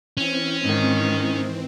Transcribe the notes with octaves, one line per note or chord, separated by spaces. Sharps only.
E3 C4 C#4
G#2 D#3